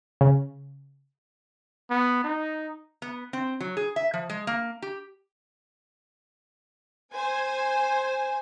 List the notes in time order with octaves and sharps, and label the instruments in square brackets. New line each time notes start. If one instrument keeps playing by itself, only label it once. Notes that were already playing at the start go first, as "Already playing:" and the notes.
[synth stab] C#3
[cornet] B3
D#4
[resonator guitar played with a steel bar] B3
C4
F#3
G#4
E5
F3
G#3
A#3
G4
[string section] C5 G#5